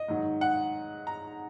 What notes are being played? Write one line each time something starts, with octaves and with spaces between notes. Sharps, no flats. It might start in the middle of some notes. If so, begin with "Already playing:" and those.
Already playing: D#5
G#2 D#3 F#3
F#5
A#5